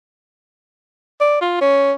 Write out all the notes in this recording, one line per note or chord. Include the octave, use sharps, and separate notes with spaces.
D5
F4
C#4